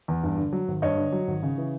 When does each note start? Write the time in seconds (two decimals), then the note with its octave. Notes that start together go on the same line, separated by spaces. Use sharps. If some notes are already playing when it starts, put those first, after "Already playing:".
0.08 E2
0.23 G2
0.38 D3
0.53 F#3
0.68 G#1
0.82 G2 C#5 D#5
0.98 D3
1.12 F#3
1.28 G#1
1.43 C#3
1.58 E3